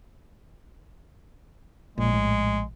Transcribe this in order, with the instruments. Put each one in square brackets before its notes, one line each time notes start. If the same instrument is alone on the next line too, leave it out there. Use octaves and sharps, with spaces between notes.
[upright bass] A#1 [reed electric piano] A#2 [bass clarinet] G#3
[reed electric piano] A2